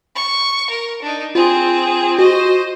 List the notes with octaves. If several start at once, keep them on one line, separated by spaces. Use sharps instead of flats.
C#6
A#4
D4 D#4
C4 F4 G#4
F#4 C5 D#5